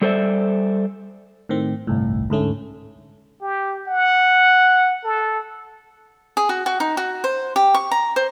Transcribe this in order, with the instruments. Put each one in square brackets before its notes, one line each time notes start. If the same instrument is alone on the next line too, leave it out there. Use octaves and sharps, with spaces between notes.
[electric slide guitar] G3 A4 C5 D5 E5
[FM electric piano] A2 D#3 C4
G1 C2 A2
D2 G#2 A3 C#4
[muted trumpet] G4
F#5
A4
[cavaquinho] G#4
F#4
F#4
D#4
F#4
C5
G4
C#6
A#5
C5